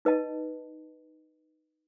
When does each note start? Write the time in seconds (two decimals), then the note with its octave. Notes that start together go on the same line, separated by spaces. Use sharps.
0.05 D#4 B4 D#5 A5